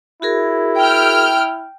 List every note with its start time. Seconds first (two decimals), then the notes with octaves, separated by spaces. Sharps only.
0.22 E4 F#4 G#4 A#4
0.77 G5 F6